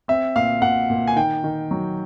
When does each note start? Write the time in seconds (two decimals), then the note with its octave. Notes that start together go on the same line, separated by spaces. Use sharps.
0.08 C4 E5
0.36 A#2 F5
0.62 A#2 F#5
0.90 A#2
1.08 G#5
1.16 D#3 G5
1.44 D#3
1.71 F#3